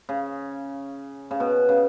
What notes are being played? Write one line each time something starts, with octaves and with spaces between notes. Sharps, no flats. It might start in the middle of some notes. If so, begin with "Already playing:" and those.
C#3
C#3
B2
C#3